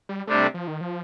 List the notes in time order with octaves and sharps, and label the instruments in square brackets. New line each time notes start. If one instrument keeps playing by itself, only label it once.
[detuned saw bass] G3
[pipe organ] C3 G3 D4 [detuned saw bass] A3
[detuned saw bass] F3
D#3
F3